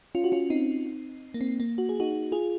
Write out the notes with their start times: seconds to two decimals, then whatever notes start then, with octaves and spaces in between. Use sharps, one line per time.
0.15 C#4 F4
0.24 F#4
0.32 C#4 F4
0.50 C4 D#4
1.34 A#3
1.41 C4
1.60 A#3
1.78 F#4
1.89 G#4
2.00 D#4 F#4
2.32 F4 G#4